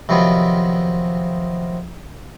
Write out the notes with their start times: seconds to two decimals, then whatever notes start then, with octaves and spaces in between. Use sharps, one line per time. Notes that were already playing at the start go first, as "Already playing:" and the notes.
0.09 C3 D#3 F3 F#3 B3 C4